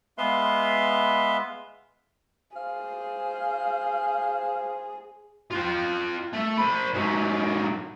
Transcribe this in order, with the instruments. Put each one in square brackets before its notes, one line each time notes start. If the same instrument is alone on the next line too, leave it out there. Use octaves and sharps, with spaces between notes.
[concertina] G#3 B3 B4 E5 F5 C6
[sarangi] G#4 [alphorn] C5 [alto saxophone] F5
[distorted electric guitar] F4 G5
A3
C5 B5
G#2 F#3